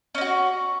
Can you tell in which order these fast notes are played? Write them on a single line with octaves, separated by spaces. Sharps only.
C#4 D#4 F#4